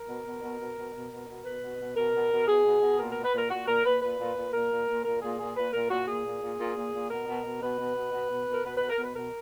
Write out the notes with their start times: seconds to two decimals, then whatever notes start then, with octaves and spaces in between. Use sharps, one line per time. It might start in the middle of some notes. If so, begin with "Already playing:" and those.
Already playing: A#4
0.08 B2
0.25 B2
0.42 B2
0.59 B2
0.77 B2
0.94 B2
1.11 B2
1.28 B2
1.45 B2 B4
1.62 B2
1.79 B2
1.96 B2 A#4
2.14 B2
2.31 B2
2.47 B2 G#4
2.65 B2
2.82 B2
2.99 A#2 A#4
3.12 A#2 A#4
3.25 B4
3.33 A#2 A#4
3.51 A#2 F#4
3.67 A#2 A#4
3.84 A#2 B4
4.02 A#2 B4
4.20 A#2
4.36 A#2
4.53 A#2 A#4
4.71 A#2
4.88 A#2
5.04 A#2 A#4
5.22 A#2 G#4
5.39 A#2 G#4
5.56 A#2 B4
5.73 A#2 A#4
5.90 A#2 F#4
6.08 A#2 G#4
6.25 A#2
6.42 A#2
6.58 A#2
6.76 A#2
6.93 A#2
7.10 B2 A#4
7.28 B2
7.44 B2
7.61 B2 B4
7.79 B2
7.95 B2
8.13 B2
8.30 B2
8.47 B2
8.53 A#4
8.64 B2 B4
8.77 B2 B4
8.89 A#4
8.98 B2 B4
9.15 B2 A#4